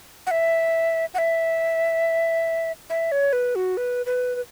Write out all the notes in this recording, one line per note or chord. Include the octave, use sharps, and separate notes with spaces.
F#5
E5
F#5
E5
E5
C#5
B4
F#4
B4
B4
B4